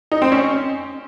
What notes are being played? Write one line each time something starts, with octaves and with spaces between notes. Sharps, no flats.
D#4
C4
C#4